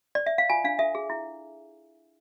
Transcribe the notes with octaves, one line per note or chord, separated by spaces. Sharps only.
D5
E5
F5
F4 G#5
D4 F5
A4 E5
G#4
E4